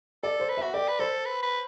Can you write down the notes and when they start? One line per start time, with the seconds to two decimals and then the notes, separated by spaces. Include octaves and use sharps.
0.23 A4 D5
0.40 C5
0.49 B4
0.57 E5
0.63 F#4
0.74 G4 D5
0.88 B4
0.99 A4 C5
1.25 B4
1.43 B4